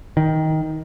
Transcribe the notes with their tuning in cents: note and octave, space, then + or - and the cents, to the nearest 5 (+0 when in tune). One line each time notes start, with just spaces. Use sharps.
D#3 +15